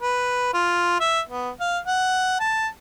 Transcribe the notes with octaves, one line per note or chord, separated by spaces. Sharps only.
B4
F4
E5
B3
F5
F#5
A5